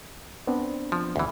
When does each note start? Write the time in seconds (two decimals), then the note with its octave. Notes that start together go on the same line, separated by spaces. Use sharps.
0.47 B3 C4 D4
0.92 F3
1.16 D2 E3